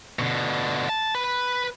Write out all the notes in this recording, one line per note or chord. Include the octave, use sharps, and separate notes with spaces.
B2 D3
A5
B4